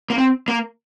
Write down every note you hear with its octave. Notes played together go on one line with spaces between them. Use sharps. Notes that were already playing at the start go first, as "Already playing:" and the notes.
A#3
C4
A#3